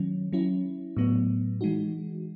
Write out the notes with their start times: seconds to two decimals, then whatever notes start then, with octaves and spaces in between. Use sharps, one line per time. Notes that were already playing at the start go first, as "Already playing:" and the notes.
Already playing: D#3 F#3 C#4
0.32 F#3 C#4 E4
0.97 A2 F#3 B3
1.61 E3 G#3 D#4 F#4